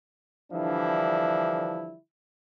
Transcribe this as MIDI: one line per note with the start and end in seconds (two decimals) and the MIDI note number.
0.53 1.96 50
0.53 1.96 52
0.53 1.96 53
0.53 1.96 55
0.53 1.96 62
0.53 1.96 64